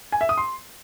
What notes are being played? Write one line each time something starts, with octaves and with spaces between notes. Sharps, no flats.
G#5
E5
D#6
C6